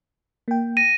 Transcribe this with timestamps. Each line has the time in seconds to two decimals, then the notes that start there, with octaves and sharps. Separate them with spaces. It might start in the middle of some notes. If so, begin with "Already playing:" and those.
0.48 A#3 G5
0.77 A#6 D#7